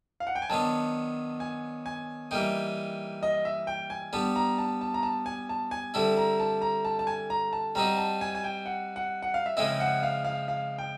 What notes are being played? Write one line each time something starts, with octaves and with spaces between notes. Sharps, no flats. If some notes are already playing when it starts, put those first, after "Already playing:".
F5
F#5
G5
G#5
D#3 F#3 B3 D4 A5
G#5
G#5
E3 G3 A#3 D#4 G5
D#5
E5
G5
G#5
G3 B3 D4 A5
A#5
A5
A5
A#5
A5
G#5
A5
G#5
D3 G3 C4 E4 A5
A#5
A5
A#5
A5
A5
G#5
A#5
A5
G3 C4 D#4 F#4 A#5
A5
G#5
G#5
G5
F#5
F#5
F#5
F5
E5
C#3 F3 G#3 C4 E4 D#5
F#5
F5
F5
F5
G5